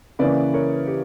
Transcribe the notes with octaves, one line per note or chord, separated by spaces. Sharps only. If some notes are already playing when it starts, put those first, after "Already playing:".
C#3 E3 A#3 C#4 B4 D5
A#4 C#5
G4